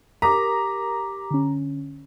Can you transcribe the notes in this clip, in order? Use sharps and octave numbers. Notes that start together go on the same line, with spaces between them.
G4 A#4 A#5 D6 D#6 A#6 B6
D3 C#4